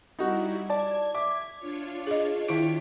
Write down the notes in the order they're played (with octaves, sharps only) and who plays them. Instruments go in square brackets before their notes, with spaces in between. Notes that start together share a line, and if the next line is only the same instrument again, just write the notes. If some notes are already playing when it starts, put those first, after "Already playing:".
[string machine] G3 E4 [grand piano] D#4 F#4
[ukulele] D5 [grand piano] A5 [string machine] G#6
[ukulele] E5 [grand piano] D6
[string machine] D4 F4 C#5
[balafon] G#4 D#5
[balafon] D#3 E4 [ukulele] G4 E5 A5 [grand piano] D7